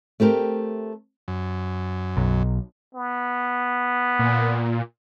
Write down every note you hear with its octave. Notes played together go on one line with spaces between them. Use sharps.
A3 C4 G4 A#4
F#2
B1
B3
A#2